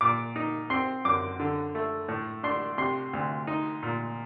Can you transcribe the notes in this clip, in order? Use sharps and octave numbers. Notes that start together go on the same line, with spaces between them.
A#2 D6
D#4
C4 C6
F#2 D6
D3
A3
A2
D4 C6
C3 C6
D2
D#4
A#2